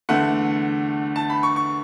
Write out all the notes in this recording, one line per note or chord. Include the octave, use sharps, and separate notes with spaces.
E2 D3 A3 F#5
A5
B5
C#6
C#6